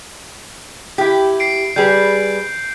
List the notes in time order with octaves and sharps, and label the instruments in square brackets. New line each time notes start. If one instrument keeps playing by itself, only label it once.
[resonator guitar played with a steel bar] E4 G4
[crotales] C7 D7
[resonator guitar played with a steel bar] G3 G#4 B4 [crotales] G6